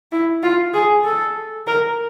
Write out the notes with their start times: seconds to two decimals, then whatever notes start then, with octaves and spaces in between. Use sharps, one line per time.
0.12 E4
0.43 F4
0.74 G#4
1.05 A4
1.67 A#4